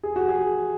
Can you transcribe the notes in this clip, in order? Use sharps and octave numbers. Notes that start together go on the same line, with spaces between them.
G#4
F#4
G#4